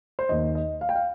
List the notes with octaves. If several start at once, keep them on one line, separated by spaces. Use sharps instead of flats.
C5
D#2 D#3 D#5
D#5
F5
G5
F5